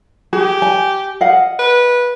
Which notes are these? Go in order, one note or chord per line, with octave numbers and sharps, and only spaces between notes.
G4 G#4
G#5
D#5 F5 F#5
B4